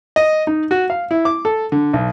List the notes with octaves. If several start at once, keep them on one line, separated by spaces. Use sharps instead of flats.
D#5
D#4
F#4
F5
E4
D6
A4
D3
B1